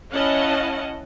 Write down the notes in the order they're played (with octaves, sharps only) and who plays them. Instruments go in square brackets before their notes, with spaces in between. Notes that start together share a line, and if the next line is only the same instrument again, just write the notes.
[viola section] C#4 E4 D#5 F5 F#5 A5